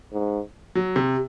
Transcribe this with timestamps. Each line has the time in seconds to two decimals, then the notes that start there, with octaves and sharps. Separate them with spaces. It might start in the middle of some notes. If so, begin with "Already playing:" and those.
0.13 G#2
0.75 F#3
0.96 C3